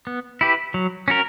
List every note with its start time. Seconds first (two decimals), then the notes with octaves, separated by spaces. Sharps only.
0.07 B3
0.41 E4 G4 B4
0.74 F#3
1.08 C#4 F#4 A#4